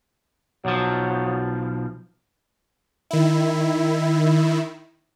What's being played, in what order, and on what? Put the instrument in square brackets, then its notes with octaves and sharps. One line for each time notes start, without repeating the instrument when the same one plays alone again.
[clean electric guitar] B1 F3 [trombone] F#3
[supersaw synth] D#3 E4